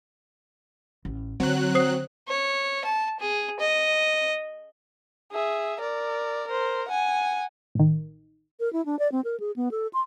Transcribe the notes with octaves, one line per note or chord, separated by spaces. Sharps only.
A1
D3 F#3 C4 F#6
C5 D#6 C7
C#5
A5
G#4
D#5
G#4 E5
A#4 D5
A#4 C5
F#5 G#5
A1 D#3
A#4
E4
D4
D5
C4
A#4
G#4
B3
A4
C6